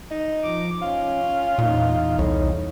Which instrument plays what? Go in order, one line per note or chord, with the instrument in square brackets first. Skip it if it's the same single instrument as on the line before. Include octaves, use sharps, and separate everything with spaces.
[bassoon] D#4
[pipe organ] F3 D6
[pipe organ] C#4 [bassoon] F4
[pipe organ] C#4
[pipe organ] E2 D#4 [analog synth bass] A#2
[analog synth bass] C2 [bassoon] A2